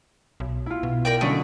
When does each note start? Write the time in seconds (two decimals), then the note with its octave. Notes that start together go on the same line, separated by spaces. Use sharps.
0.40 B1
0.66 E4 F4
0.83 B2
1.05 A#4 D5 G5
1.21 D3 F#3 A3 C#4 D#5